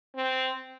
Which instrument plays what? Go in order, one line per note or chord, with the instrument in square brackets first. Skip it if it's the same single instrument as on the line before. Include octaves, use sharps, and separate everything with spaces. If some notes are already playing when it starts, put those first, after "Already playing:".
[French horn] C4